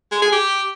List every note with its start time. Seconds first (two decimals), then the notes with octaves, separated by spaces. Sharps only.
0.12 G#3
0.22 G#4
0.32 G4